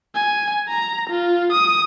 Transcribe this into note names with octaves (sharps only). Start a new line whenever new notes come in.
G#5
A#5
F4
D#6